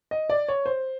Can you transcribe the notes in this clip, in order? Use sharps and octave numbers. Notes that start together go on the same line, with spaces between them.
D#5
D5
C#5
C5